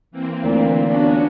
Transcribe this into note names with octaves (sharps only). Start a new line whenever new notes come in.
E3 A#3 C4
D2 A#2
B3 C#4 D4 F#4